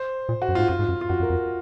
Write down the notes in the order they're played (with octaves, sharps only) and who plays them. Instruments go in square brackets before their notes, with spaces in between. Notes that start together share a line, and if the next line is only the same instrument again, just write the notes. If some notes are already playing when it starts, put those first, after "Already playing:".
Already playing: [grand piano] C5
[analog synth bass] A#2
[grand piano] F#4
[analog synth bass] F#2
[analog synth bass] G#2 [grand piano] F4
[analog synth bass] F#2 [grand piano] F4
[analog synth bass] G#2
F#2
[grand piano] F4
[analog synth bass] F#2 [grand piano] F#4
[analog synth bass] F#2
[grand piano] A#4
[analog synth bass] F2